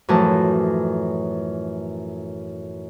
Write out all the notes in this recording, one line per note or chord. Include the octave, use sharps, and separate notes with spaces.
F#2 A2 E3 F3 A5